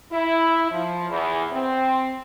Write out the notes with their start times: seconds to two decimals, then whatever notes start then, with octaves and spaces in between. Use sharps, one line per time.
0.12 E4
0.71 F3
1.10 E2
1.53 C4